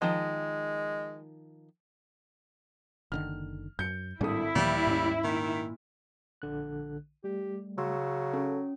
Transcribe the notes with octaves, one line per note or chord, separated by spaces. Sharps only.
D#3 F3 G#3
F#1 D3 D#3 F6
F#2 G6 C#7
G#1 A2 G3 D4 E4 A4 D#6
D#2 A#2 E3 F3 G3
G#2 C#4
A#2 D#3
A#1 D3 F#6
G3 A3 G4
C#3 F#3 C6 E6
C#4 A4